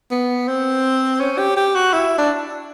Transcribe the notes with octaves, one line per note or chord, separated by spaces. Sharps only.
B3
C4
C#4
G4
G4
F#4
E4
D4